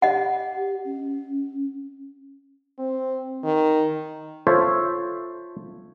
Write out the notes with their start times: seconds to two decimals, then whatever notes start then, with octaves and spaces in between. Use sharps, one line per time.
0.02 G4 D#5 F#5
0.85 C#4
2.78 C4
3.44 D#3
4.47 F4 A4 C5 C#5 E5